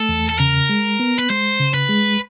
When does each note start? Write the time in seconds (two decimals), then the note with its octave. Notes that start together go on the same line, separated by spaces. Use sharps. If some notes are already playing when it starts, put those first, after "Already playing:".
Already playing: A3 A4
0.09 E2
0.29 A4
0.39 C#3 A#4
0.69 G#3
1.00 B3
1.19 B4
1.30 G#3 C5
1.60 C#3
1.74 B4
1.89 G#3